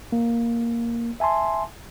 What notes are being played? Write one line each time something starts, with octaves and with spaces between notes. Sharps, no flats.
A#3
E5 G#5 A5 C6